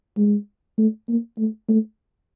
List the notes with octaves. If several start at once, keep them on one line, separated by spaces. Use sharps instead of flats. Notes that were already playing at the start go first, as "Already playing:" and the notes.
G#3
A3
A#3
A3
A3